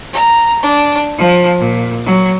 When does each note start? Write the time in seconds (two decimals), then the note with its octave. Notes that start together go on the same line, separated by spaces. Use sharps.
0.13 A#5
0.63 D4
1.18 F3
1.58 A#2
2.06 F#3